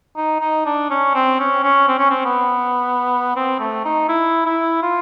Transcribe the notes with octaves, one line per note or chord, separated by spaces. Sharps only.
D#4
D#4
D4
C#4
C4
C#4
C#4
C4
C#4
C4
B3
C4
A3
D#4
E4
E4
F4